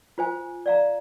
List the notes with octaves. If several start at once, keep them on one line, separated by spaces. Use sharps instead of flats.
F4 C5 G#5
D5 F5 A#5